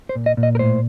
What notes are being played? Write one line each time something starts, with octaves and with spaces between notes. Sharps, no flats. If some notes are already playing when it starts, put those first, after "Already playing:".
C5
A#2
D#5
A#2
D#5
A#4
A2 C5